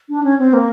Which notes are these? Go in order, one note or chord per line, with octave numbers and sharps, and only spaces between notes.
D4
C#4
C4
A#3